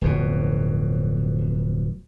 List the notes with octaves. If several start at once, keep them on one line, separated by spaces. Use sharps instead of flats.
D1 F2 B2